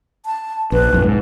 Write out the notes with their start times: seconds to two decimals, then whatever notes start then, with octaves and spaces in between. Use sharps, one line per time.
0.26 A5
0.72 A#1 B4
0.92 B1 F#2
1.03 G#2